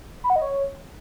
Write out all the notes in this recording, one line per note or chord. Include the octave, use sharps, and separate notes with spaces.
B5
F#5
D#5
C#5